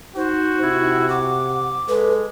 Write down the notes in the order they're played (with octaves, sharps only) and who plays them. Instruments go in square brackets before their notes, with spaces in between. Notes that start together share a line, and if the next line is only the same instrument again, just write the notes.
[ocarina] D#4 [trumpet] F#4 [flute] C5
[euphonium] C3 [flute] E4
[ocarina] F#5 [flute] D6
[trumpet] G#3 [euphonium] A4 [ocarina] B4